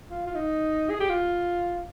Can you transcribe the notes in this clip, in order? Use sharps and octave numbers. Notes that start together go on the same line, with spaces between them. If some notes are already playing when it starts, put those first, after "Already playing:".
F4
F4
D#4
G#4
G4
F4